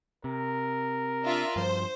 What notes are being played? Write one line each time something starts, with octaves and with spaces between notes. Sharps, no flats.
C3 A#4
D4 F4 E5
G2 F3 C5